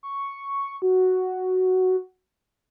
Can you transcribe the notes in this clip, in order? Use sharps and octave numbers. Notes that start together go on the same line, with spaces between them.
C#6
F#4